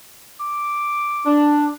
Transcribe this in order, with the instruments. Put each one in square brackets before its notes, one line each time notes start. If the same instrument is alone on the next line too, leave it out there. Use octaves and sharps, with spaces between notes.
[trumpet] D6
[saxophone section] D4